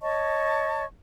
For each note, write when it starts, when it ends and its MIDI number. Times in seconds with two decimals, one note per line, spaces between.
0.01 0.85 73
0.01 0.85 75
0.01 0.85 81
0.01 0.85 85